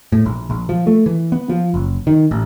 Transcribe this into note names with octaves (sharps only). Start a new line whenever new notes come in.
A2
A#1
A#1
F3
A3
E3
B3
F3
F#1
D#3
A1